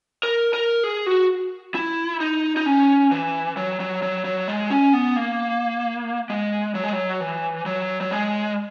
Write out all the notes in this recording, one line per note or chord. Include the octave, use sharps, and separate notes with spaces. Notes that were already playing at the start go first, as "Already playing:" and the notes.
A#4
A#4
G#4
F#4
E4
D#4
D#4
C#4
E3
F#3
F#3
F#3
F#3
G#3
C#4
B3
A#3
G#3
F#3
G#3
F#3
E3
F#3
F#3
G#3